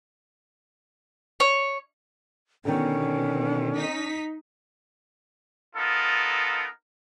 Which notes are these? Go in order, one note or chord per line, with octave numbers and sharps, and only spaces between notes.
C#5
B2 D3 D#3 C#4
D#4 B6
B3 D#4 F4 A4 A#4